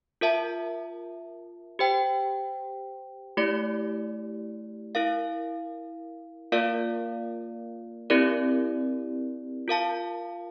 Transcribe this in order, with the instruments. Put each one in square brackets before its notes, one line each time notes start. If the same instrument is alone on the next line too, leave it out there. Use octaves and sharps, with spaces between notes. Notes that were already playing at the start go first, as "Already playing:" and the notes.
[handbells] F4 A#4 E5 A5
G4 C5 G5
A3 E4 G4 D5
E4 A#4 F5
A#3 F4 A#4 D5 F5
C4 E4 G4 A#4 D5
F4 A#4 F5 A5